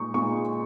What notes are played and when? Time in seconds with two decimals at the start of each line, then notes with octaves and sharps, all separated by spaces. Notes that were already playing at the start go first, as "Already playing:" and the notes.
Already playing: A#2 G#3 D#4 C#6
0.14 A#2 G#3 D#4 C#6